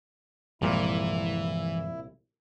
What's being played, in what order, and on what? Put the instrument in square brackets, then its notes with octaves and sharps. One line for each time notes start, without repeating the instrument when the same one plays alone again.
[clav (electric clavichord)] C2 A#2 [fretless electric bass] G2 F3 G#3 [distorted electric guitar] E3 [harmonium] E4